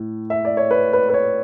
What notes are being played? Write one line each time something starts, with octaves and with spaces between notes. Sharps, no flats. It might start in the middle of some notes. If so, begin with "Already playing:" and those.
Already playing: A2
E5
D5
C#5
B4
B4
B4
C#5